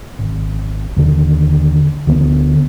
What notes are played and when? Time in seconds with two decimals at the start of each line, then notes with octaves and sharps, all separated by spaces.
0.19 G#1
0.96 D#2 D3
2.07 D2 D3 A#3 B3